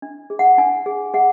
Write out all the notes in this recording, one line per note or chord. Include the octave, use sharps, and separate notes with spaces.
D4
G#4
F#5
D4 G#5
G#4
G#4 F#5